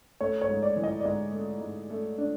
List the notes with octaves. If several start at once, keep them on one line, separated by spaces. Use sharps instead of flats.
A3 C#5
C#5
G#2
D5
E3
D#5
D5
G#2 D#5
A3
G#2
A3
D4